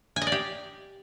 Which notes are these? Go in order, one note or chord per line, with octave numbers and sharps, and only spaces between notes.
G#5
D#5
D5
G4